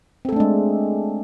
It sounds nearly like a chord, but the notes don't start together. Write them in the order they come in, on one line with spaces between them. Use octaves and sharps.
C4 A4 A3 D4 G#3